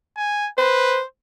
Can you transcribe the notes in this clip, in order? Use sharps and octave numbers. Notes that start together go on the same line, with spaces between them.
G#5
B4 C5